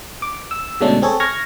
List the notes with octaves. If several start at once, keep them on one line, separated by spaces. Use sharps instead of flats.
D6
E6
B2 D3 G#3 A3 C#4 D4
C4 G#4 A4 C#5
C#6 F6 G#6 A#6